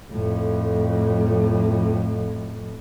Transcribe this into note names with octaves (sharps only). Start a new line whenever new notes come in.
F2 A2